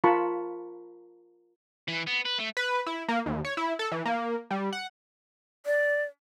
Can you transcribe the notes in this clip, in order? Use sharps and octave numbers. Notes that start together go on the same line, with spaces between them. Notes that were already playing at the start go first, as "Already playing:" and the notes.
F4 A#4 A5 B5 C#6
E3
B3
B4
A3
B4
E4
A#3
D#2
C#5
E4
A4
E3
A#3
G3
F#5
D5